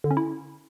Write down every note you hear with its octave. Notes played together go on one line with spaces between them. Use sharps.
D3
C#4
E4